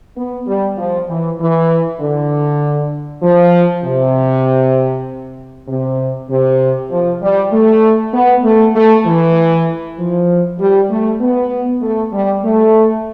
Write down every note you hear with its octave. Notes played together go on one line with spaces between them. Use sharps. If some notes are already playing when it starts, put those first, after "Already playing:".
B3
G3
F3
E3
E3
D3
F3
C3
C3
C3
F3
G3
A3
B3
A3
A3
E3
F3
G3
A3
B3
A3
G3
A3